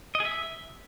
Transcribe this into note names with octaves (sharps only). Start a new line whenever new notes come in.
D#5
G#4
E5